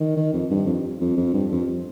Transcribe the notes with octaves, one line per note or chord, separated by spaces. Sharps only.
D#3
D#3
F2
G2
F2
F2
F2
G2
F2